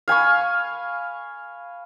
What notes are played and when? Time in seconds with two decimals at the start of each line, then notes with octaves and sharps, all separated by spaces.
0.08 F5 G#5 B5 C#6